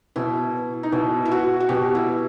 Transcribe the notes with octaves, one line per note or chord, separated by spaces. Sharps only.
B2 E4
D#4
B2 E4
E4
F#4
F#4
B2 G4
E4